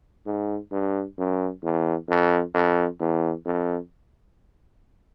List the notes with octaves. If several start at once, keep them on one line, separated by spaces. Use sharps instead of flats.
G#2
G2
F#2
E2
F2
F2
E2
F2